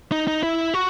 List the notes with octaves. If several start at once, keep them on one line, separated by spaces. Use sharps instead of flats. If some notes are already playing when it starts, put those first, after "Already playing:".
D#4
D#4
E4
F#4